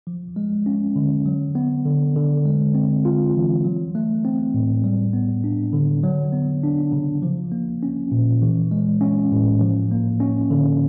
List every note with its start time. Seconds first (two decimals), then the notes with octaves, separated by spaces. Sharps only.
0.07 F3
0.36 G#3
0.66 C#4
0.96 D3
1.26 F#3
1.55 B3
1.85 D3
2.16 D3
2.45 G#3
2.75 C4
3.05 F4
3.35 E3
3.64 F#3
3.95 A3
4.25 C4
4.54 A2
4.84 G3
5.13 B3
5.44 D4
5.73 D3
6.03 F#3
6.32 B3
6.63 D4
6.92 C#3
7.22 F3
7.52 A#3
7.83 C#4
8.11 A#2
8.42 E3
8.71 G#3
9.01 C#4
9.32 A2
9.61 F3
9.91 A#3
10.20 C#4
10.50 D3